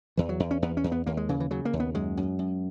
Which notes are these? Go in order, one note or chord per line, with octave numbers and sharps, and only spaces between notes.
E2 E3
F#3
E2
C#4
E2 B3
C#4
E2
B3
D#2 A#3
G#3
C#3 E3
E3
C#3 F#3
A#3
D#2
B3
F#2 G#3
F#2
F#2